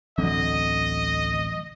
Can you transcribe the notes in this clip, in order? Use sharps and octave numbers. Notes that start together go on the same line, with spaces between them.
A1 D2 D3 F#3 C4 D#5